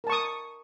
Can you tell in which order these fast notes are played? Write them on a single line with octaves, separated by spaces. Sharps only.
A#4 A5 C#6 D#6